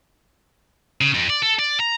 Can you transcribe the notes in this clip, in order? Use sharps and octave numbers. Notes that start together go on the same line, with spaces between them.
C#3
F2
D5
A4
D5
A#5